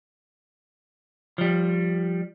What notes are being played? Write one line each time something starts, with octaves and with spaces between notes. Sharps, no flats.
F3 G3